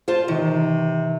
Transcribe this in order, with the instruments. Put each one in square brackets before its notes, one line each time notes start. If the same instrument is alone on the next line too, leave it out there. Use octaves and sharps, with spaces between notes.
[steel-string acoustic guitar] F4 C5 A5
[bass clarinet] C3 [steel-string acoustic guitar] D#3 [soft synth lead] E3